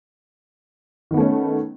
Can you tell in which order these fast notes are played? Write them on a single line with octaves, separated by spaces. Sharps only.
D#3 B3 A3 C#4